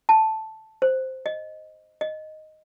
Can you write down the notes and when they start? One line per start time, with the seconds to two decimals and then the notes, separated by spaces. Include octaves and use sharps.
0.09 A5
0.82 C5
1.26 D#5
2.01 D#5